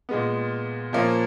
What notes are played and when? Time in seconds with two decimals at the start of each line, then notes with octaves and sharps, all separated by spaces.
0.09 A#2 G#3 B3
0.93 A#2 F3 A#3 C#4